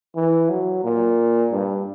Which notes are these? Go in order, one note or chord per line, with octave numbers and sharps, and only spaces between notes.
E3
F#3
A#2
G2